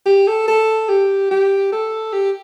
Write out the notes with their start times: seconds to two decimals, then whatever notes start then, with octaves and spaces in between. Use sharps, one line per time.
0.06 G4
0.27 A4
0.48 A4
0.89 G4
1.31 G4
1.72 A4
2.13 G4